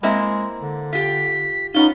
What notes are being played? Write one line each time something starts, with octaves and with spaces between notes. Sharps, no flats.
G#3 A#3 C4 E4
D3
F4 G4 B6
B3 C#4 D#4 F4 G7